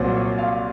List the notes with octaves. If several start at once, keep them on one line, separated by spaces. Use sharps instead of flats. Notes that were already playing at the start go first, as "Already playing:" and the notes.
Already playing: C2 A#2 F#3 C5
C#5
F5